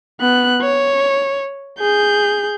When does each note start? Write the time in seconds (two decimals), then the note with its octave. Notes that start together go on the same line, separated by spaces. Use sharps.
0.21 B3 F#6
0.61 C#5
1.80 G#4 G6